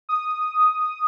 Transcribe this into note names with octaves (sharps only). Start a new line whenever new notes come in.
D#6